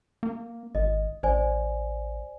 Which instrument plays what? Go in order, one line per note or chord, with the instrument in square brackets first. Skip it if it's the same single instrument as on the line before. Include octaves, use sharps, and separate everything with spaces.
[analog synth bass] A#3
[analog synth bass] G#1 [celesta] D#5
[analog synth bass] A1 [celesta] C5 D5 G#5